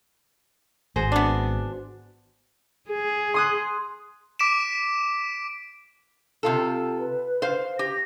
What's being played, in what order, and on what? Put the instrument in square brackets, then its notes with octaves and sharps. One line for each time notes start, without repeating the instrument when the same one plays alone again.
[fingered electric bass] G#1 [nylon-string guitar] F#4 G#4 C5
[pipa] B3 D4
[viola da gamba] G#4
[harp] C6 D#6 F#6
[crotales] D6 B6 D7 E7
[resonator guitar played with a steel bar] C3 F4 A4
[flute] B4
[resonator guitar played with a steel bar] C5 F5
[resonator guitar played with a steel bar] G4 [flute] A#6